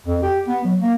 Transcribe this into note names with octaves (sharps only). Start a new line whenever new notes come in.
F2
G4
B3
F#3
A#3